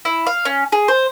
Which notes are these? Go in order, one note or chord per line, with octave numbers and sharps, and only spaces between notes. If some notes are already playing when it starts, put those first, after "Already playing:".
E4
F5
C#4
G#4
C5